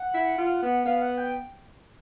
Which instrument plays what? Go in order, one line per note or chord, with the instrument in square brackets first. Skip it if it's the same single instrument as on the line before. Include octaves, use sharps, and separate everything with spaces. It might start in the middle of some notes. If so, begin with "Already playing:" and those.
Already playing: [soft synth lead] F#5
[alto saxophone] E4
F4
B3
[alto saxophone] B3 [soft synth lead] F5
[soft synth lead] F#5
G5